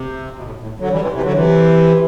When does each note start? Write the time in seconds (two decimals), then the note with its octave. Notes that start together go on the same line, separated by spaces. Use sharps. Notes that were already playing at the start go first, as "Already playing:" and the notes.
Already playing: C3
0.36 B2
0.44 A2
0.60 A2
0.79 D3 F#3
0.91 E3 G3
1.01 C3 E3
1.12 C3 E3
1.23 D3 F#3
1.34 C3 E3